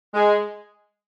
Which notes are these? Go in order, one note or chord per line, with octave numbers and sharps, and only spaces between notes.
G#3